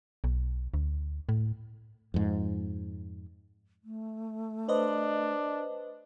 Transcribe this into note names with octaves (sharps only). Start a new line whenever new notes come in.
B1
D2
A2
F2 G#2
A3
D4 B4 C5 D#5